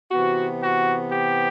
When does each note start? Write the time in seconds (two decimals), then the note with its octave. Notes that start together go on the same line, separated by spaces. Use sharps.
0.11 C3 E3 B3 F#4
0.62 F#4
1.11 G4